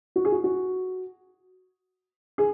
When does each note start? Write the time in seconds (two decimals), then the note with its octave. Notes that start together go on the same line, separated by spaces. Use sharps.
0.16 F#4
0.25 G#4
0.32 F#4
0.44 F#4
2.38 G#4